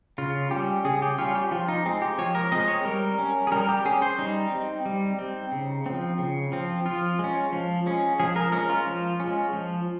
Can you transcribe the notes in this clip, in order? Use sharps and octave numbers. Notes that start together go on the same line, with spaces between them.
C#3 F4
G3 C#4 G4
C#3 G#4
G4
G3 C#4 F4
G4
F3 F4
D#4
G#3 C4
G4
F3 C#5
A#4
G#3 C4 D#5
C#5
G3 A#4
C#4
G#4
G3 A#4
G4
C#4 G#4
C5
G3 D#4
C4
G3
C4
C#3
F3 C4
C#3
F3 C4
F3 F4
G#3 C#4
F3
G#3 C#4
F3 G#4
A#4
G#3 C#4 A#4
F4
F3
G#3 C#4
F3